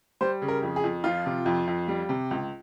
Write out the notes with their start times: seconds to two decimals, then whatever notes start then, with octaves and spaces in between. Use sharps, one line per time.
0.21 G3 C5
0.42 C#3
0.48 A#4
0.63 F2
0.76 G#4
0.84 F2
1.04 F3 F4
1.26 C3
1.46 F2
1.67 F2
1.88 G3
2.09 C3
2.31 C#2